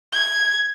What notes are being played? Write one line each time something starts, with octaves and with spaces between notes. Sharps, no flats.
G#6